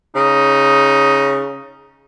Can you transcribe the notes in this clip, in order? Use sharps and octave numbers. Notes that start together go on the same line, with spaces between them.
C#3 D#4